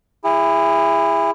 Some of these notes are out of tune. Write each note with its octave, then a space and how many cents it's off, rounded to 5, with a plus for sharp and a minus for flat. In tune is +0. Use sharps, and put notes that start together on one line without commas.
E4 +10 G#4 -35